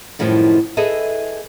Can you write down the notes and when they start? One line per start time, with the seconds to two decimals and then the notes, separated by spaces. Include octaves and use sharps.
0.19 F#2 A2 D#3 F3 G3
0.77 G#4 A4 B4 D#5 E5